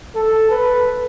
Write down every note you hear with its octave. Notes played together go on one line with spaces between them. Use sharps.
A4
B4